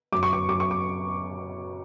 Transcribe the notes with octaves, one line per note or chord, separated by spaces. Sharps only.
F#2 D6
C#6
D6
F#2 D6
C#6
D6